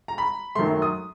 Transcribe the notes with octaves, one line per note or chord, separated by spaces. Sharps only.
A#5
B5
F#2 D#3 F#3 A3 C6
D#6